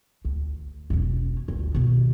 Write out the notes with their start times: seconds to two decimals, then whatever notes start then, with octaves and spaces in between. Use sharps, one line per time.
0.25 D2
0.90 E1 C#4
1.48 G#1 D2
1.75 B2 D#3